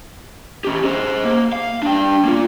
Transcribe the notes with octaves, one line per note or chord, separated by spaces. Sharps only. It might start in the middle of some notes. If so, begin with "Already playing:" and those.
C#4 G4
G#4 C5
A#3
F5
D4 G5
A#3 F4